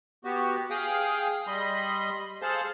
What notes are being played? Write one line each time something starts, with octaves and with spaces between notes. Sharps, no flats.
B3 F#4 G4
G#4 F5 G5 D#6
G3 D#5 B5 C6
G#4 A4 C5 F5 A5